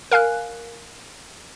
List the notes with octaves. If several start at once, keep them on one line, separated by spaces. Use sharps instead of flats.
A#4 F5 G#5 F#6